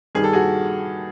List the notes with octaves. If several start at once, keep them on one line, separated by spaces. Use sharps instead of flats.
G2 D#3 G3 G#4
A4
F#4 G#4